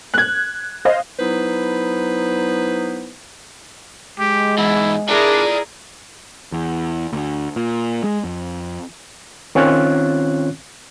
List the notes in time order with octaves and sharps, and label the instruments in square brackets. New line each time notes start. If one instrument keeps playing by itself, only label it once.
[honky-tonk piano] F#6 G#6
C5 D#5 F5
[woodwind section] F#3 B3 D#4 E4 B4 C5
[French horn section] G#3 [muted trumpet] G4
[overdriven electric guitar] E2 G#2 [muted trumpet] E4
[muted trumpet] D4 [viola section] E4 G#4 A#4 [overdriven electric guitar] D5 G#5
[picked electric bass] E2
D2
A#2
G#3
F2
[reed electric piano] D#3 C4 C#4 F4 C#5 F#6